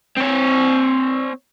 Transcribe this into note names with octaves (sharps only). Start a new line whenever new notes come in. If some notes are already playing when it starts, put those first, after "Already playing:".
C4 C#5